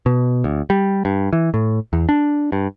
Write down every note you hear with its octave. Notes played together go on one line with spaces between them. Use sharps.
B2
D2
G3
G2
E3
A2
E2
D4
G2